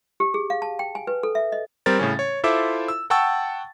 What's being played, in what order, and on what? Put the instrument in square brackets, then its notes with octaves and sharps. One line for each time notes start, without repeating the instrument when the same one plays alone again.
[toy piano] G4
G#4
F5
A5
G5
G#5
B4
A4
E5
D#5
[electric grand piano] G3 C4 A#4 A6
A2 C#3 C#4
C#5
E4 F4 A4 C5 E5 D6
E6
F#5 G5 A5 C#6 E6 A6